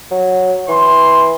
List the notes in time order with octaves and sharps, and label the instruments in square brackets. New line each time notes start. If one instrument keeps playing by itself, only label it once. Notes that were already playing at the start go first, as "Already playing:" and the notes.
[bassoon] F#3
[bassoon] E3 [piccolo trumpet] C6